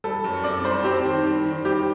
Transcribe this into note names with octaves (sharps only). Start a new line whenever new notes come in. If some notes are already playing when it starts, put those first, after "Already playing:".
G3 A4
F#2
C4 D5
G3 C5
C4 G4
D#3
G3
D#3
G3 G4